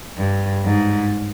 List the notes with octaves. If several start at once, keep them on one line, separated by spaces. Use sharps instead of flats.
G2
G#2